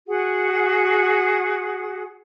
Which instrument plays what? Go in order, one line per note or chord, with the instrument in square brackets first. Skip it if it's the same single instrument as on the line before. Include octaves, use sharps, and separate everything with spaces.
[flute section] F#4 G#4 F#5